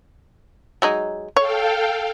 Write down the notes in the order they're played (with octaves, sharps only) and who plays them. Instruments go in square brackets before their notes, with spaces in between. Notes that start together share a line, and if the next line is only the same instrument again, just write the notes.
[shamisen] F#3 G#3 D#4
[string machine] A4 F5 G5 [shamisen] C#5